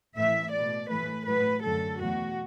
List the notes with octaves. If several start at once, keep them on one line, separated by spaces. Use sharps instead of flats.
A2 E3 A3 E5
B2 A3 D5
A2 E3 A3 B4
A2 F#3 A3 B4
F#2 D3 F#3 A3 A4
E2 B2 F#3 A3 F#4